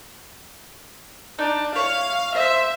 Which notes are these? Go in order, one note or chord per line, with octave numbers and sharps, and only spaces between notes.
D4 D#4
E4 C#5 F5
C5 E5